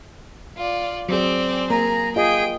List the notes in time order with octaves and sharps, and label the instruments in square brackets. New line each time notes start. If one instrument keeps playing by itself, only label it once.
[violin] F4 D5
[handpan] F#3 G#4 [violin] C4 D5
[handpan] A#3 [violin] G#4 [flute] A#5
[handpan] F4 D#5 [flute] G#4 [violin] G5